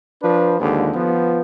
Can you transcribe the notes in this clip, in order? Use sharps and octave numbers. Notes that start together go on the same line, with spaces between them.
F3 D4 B4
D#2 G#2 D3
F3 B3